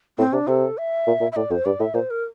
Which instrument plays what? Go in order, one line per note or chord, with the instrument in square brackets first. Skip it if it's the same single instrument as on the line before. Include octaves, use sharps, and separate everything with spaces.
[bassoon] A2 [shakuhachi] C4
[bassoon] C3 [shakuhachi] D4
[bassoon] C3 [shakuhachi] A4
[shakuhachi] E5
[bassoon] A#2
A#2
[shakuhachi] E5
[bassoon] A2 [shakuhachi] D5
[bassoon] F2 [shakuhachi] C5
[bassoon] G2 [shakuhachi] D5
[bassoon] A2 [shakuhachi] E5
[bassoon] A#2 [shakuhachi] C5
[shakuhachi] A#4